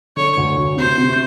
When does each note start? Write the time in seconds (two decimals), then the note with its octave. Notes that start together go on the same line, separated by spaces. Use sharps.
0.17 D3 C#5
0.37 D2
0.57 D2
0.77 C3 C5
0.98 C3